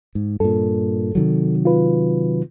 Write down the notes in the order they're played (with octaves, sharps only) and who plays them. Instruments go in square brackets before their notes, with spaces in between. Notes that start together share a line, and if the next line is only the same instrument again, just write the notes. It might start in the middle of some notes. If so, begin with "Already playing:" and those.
[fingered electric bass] G#2
[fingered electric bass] G2 A#2 [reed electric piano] A4
[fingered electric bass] C3 D#3 F#3
[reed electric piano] F4 B4